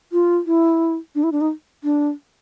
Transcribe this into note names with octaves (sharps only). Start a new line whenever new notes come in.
F4
E4
D4
E4
D4
D#4
D4